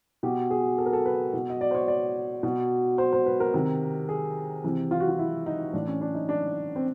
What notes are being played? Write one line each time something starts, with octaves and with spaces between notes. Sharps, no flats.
B2 G4
G#4
A4
A#4
A4
B4
B2
D#5
D5
C5
C#5
D5
B2
C5
C5
B4
A#4
C3 D#3
G#4
C3 E3
F4
F#4
F4
E4
D#4
A2 E3 D4
C#4
D4
D#4
D4
C4